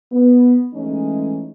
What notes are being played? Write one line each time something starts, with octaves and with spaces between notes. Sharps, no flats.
B3
E3 G#3 A3 C#4 D#4